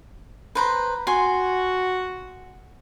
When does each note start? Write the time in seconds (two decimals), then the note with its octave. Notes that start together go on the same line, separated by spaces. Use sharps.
0.55 B4 C5 A#5
1.07 F#4 G#5 C6